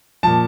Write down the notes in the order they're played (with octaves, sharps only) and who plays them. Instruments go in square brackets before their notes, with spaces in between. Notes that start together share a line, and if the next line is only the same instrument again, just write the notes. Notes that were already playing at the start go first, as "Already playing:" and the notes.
[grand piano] A#2 F3 A5